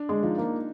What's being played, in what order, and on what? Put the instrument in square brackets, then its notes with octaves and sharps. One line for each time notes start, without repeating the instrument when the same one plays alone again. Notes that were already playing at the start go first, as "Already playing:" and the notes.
Already playing: [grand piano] D4
[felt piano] G#3
[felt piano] F3 [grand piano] D#4
[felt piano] A#3